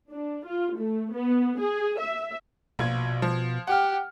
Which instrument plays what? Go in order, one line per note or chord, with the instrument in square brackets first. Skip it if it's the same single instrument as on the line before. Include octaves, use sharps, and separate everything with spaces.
[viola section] D4
F4
A3
B3
G#4
E5
[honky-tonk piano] A#1 F4 G#6 [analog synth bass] B2
[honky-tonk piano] F3
[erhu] G4 [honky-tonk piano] F#5 F6